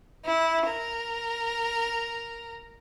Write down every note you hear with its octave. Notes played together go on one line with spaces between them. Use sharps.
E4
A#4